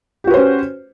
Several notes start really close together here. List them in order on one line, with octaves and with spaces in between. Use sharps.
G4 F#4 B4 C5 C#4